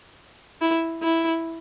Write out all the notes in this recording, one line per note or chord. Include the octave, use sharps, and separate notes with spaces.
E4
E4